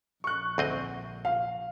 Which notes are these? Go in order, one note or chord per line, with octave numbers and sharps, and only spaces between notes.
A#1 C#6 F#6
D2 C4 D#5
F5